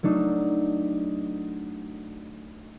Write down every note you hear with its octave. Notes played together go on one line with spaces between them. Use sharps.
F#3 A3 D4 D#4